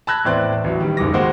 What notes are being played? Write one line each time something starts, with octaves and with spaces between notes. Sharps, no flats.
A5 B5 E6 F#6 G#6 A#6
E2 A2 C4 D5 C6 F#6
A1 F#3
D#3 G3
F#1 G#2 D6 A#6
D#3 G#3 A#3 F#4 A#4 C5